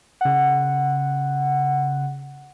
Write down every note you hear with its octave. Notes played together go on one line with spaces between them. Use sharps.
C#3 F#5